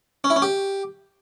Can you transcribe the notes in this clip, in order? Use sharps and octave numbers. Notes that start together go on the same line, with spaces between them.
C#4
E4
C#4
G4